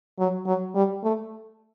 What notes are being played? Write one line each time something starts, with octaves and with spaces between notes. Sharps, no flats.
F#3
F#3
G3
A3